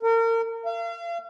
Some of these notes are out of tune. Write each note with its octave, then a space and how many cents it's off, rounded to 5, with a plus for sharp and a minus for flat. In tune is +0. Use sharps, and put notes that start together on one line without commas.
A#4 -35
F5 -40